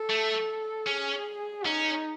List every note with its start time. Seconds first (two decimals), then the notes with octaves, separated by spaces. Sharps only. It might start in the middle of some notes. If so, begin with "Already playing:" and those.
Already playing: A4
0.09 A3
0.87 C#4 G#4
1.66 C#4 D#4